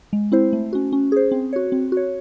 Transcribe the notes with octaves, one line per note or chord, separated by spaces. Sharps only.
G#3
C4 E4 C5
A3
C#4 F#4
C#4
G#4 C5
C4
F#4 C#5
C4
F#4 C#5